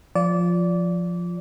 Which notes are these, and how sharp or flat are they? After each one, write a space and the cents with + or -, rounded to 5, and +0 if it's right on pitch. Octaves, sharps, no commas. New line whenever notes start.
F3 +5 F4 +0 D5 -20